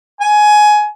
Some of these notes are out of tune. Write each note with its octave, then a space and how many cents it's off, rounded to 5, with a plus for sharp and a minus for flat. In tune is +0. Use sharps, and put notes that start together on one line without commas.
G#5 +15